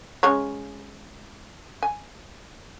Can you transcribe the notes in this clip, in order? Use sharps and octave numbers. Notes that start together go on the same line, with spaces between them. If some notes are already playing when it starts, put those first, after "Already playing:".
C#3 G#3 C#5
G#5